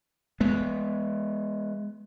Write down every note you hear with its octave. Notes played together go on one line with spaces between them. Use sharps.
G#3 B3